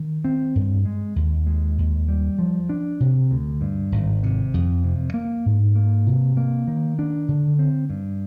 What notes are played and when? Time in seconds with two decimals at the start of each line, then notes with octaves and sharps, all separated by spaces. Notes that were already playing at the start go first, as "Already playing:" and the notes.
Already playing: D#3
0.25 C4
0.55 G2
0.85 G#3
1.16 D#2
1.46 G#3
1.78 D#2
2.08 G3
2.39 F3
2.69 D4
3.00 C3
3.31 D2
3.61 G2
3.92 G#1
4.23 C3
4.54 F2
4.84 C3
5.14 A#3
5.46 G#2
5.75 A#3
6.07 C3
6.37 A#3
6.67 D#3
6.99 D4
7.29 D3
7.59 C4
7.90 G2